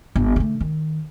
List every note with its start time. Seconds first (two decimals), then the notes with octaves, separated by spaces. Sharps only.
0.16 G1
0.36 D3 A3
0.61 D#3